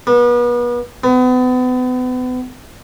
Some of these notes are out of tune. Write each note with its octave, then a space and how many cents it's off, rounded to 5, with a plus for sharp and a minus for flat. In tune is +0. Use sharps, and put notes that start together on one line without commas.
B3 -35
B3 +35